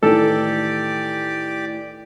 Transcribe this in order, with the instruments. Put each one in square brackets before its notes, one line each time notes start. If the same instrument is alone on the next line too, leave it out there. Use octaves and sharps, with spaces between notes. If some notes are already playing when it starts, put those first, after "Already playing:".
[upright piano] A2 D#3 E3 [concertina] G4 D5 [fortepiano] A4